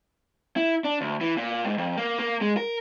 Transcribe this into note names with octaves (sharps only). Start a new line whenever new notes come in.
E4
D4
D2
E3
A#2
G#2
F2
A#3
A#3
G#3
A#4